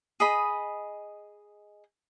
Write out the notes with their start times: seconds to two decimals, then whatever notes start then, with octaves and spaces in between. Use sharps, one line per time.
0.20 G#4 D#5 B5